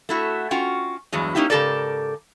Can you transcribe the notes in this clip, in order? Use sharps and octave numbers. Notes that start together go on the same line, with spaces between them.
A3 E4 F#4
C#4 F4 F#4 G5
E2 G2 F#3 G#3
A#3 C#4 D#4 E4 G4
G#2 C#3 G4 A4 A#4 D5